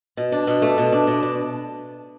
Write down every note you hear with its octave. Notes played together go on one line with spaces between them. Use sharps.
B2
D4
B2
A3
B2
D4
B2
D4